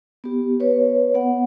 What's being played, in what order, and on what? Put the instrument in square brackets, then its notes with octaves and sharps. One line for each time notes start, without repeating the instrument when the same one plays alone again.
[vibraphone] B3 G4
B4 C#5
B3 F#5